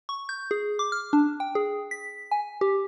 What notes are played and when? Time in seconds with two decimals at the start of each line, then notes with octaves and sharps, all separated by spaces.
0.09 C#6
0.29 G6
0.51 G#4
0.79 D6
0.92 F6
1.13 D4
1.40 G5
1.55 G#4
1.91 B6
2.31 G#5
2.61 G4